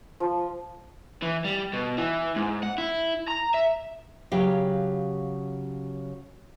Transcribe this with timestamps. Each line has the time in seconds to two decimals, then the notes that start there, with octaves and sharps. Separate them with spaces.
0.20 F3
1.22 E3
1.44 G3
1.73 B2
1.98 E3
2.36 G#2
2.63 F#5
2.78 E4
3.28 A#5
3.54 E5
4.32 C#3 F#3 G4 F5 G5